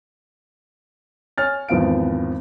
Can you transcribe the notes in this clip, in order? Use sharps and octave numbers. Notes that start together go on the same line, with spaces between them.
C#5 G#5 F6 A6
G#1 E2 F3 B3 F5 D7